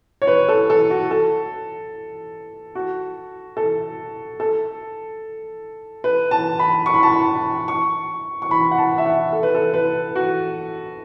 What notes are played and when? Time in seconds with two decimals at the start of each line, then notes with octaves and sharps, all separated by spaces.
0.22 C#5
0.27 B4
0.49 A4
0.70 A4
0.90 F#4
1.11 A4
2.75 F#4
3.57 A4
4.40 A4
6.04 B4
6.31 A5
6.59 B5
6.86 C#6
6.94 B5
7.03 A5
7.12 B5
7.68 C#6
8.42 C#6
8.51 B5
8.71 F#5
8.78 A5
8.98 E5
9.05 F#5
9.33 A4
9.43 B4
9.55 A4
9.74 B4
10.15 F#4